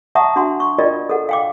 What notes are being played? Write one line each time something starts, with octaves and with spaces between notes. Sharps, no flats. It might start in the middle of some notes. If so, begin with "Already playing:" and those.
E5 F#5 A5 A#5 C#6 D#6
D4 F#4 F#5 C6
C#6
F4 A#4 D5 D#5 G5
A4 A#4 F#5
F5 G5 D6